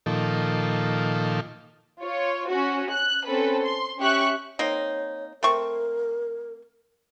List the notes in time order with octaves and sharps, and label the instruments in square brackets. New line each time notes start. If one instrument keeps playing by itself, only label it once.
[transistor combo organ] A#2 D#3 F3 A4
[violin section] F4 C#5
C#4 F#4
F#6
C4 C#4 A4 B4
C6
C#4 G4 E5 C#6 F#6
[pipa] A#3 C4 D#4 [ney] C#5
[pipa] A3 C4 C#6 [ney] A#4